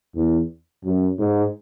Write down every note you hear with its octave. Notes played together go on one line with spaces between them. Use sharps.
E2
F#2
G#2